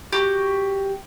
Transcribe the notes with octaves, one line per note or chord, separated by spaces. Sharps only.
F#4 G4